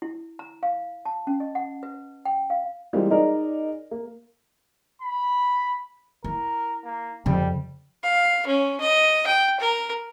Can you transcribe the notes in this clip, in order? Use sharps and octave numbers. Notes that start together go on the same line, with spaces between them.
E4
A#5
F5
A5
C#4
D#5
F#5
B4
G5
F5
E3 G3 G#3 A#3 C4 F4
D#4 G#4 A#4 D5 D#5
A#3
B5
E4 A#4
A#3
F2 C#3 G3
F5
C#4
D#5
G5
A#4